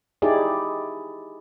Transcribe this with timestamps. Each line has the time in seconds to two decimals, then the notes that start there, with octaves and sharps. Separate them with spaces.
0.22 D#4 E4 G4 G#4 D5